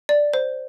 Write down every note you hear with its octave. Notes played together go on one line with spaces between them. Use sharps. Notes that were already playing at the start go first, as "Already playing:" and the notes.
D5
C5